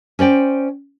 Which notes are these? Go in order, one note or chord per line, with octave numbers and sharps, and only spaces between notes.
C#4 C5 D5 G5